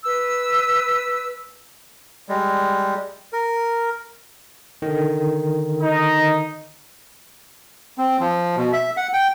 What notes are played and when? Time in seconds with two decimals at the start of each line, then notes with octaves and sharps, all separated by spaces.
0.04 B4 E6
2.29 G3 G#3
3.33 A#4
4.82 D3 D#3
5.82 D#4 D#5
7.98 C4
8.20 F3
8.57 B2
8.73 E5
8.97 F#5
9.13 G5